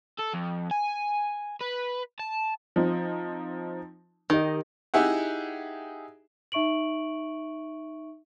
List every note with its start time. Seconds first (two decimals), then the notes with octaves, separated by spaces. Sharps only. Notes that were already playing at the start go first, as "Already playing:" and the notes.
0.19 A4
0.34 F2
0.71 G#5
1.61 B4
2.19 A5
2.76 F3 C4 D#4
4.30 D#3 G4 D#5
4.94 D#4 E4 G4 G#4 E5 F#5
6.52 D#4 E5 C#6 D7 F#7